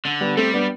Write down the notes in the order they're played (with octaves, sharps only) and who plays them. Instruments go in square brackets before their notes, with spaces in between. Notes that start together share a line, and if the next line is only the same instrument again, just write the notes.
[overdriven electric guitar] D3
[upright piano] G3 B3
[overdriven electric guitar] G3 [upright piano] A3 C4
[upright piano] B3 D4